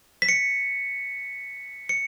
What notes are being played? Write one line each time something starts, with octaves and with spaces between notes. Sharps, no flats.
B6
C#7
C#7